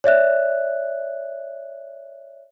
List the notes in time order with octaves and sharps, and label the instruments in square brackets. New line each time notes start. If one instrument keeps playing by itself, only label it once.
[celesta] C#5 D5 E5 F#6